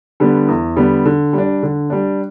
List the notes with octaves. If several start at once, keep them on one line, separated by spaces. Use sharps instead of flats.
D3 G3 B3
E2
D3 G3 B3
D3
G3 D4
D3
G3 D4